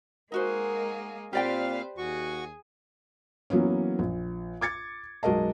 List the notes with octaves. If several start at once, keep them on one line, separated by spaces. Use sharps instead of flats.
G#3 A#3 D#4 F#4 G#4 A#4 C5
A#2 C4 G4 B4 C5 D5 F5 G5
D#2 F#4 G#4 C#6
E3 F#3 A#3 B3 C#4
A#1
D6 G#6 A6 C#7
B1 G#3 F#4 A#4 D#5 A5